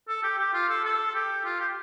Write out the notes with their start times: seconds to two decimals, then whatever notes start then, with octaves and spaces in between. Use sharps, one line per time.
0.08 A4
0.23 G4
0.39 G4
0.54 F4
0.69 A4
0.84 A4
1.15 G4
1.45 F4
1.60 G4